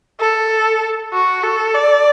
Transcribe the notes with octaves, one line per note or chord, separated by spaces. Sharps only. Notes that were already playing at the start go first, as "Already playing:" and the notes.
A4
F#4
A4
D5